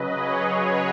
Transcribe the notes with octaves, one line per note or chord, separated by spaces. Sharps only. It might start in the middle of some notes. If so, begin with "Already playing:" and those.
Already playing: C#3 F#3 B4 D#5
G#4 C#5
F#4 B4